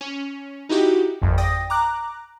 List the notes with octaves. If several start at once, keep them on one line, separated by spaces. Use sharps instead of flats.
C#4
D#4 E4 F#4 G4
G#1 F2
D5 G5 D#6 A#6
A#5 D6 F#6